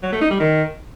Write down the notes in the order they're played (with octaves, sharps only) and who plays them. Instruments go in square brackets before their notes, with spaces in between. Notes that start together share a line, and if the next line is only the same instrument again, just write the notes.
[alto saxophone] F#3
A3
D#4
G3
D#3